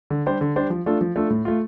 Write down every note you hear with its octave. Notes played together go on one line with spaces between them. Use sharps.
D3
G3 D4 G4 C5
D3
G3 D4 G4 C5
F3
A3 D4 F4 A4
F3
A3 D4 F4 A4
A2
A3 F4